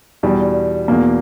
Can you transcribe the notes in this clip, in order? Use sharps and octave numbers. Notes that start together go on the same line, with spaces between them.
E2 B2 G3
E2 B2 A#3